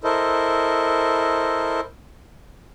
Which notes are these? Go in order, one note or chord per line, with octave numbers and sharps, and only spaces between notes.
E4 A4 A#4 C5 D#5